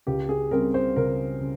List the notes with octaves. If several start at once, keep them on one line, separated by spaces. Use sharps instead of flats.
C#2 G4
G#4
C#3 G3 C4 A#4
C5
C#2 A#4
C#3